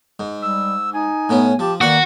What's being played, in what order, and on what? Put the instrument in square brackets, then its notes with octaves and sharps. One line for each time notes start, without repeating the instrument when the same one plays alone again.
[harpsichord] G#2
[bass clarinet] G3 [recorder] E6
[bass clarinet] D#4 [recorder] G#5
[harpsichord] A2 B3 C#4
[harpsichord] F3 [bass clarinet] G4 [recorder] A5
[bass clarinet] D#3 [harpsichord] A#3 B4 [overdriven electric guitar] F#4 [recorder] D5